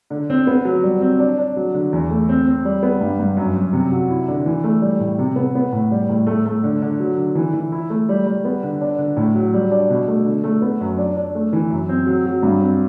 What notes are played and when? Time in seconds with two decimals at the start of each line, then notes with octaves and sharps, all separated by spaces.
0.10 D3
0.30 C4
0.47 B3
0.65 F#3
0.83 G3
1.01 C4
1.19 D4
1.38 D4
1.56 F#3
1.74 D3
1.93 E2
2.11 A3
2.29 C4
2.47 C4
2.65 G3
2.83 B3
3.01 G2
3.19 G2
3.37 F#2
3.56 F#2
3.73 C3
3.92 F#4
4.10 E4
4.28 D3
4.46 E3
4.64 A3
4.82 G3
5.00 A2
5.19 C3
5.36 B3
5.55 B3
5.73 A2
5.91 G3
6.09 A2
6.27 A3
6.46 A3
6.64 D3
6.82 D3
7.00 F#3
7.17 D3
7.35 E3
7.53 E3
7.72 E4
7.90 A3
8.09 G3
8.26 G3
8.45 B3
8.63 D3
8.81 D4
8.99 D3
9.17 A2
9.35 F#3
9.54 G3
9.71 D4
9.90 B2
10.08 A3
10.26 D3
10.44 A3
10.62 B3
10.81 F#2
10.98 D4
11.16 D4
11.35 A3
11.53 E3
11.70 F#2
11.89 C4
12.06 F#3
12.26 F#3
12.43 G2
12.61 C4